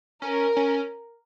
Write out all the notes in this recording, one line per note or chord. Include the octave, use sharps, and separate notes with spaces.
C#4 A#4
C#4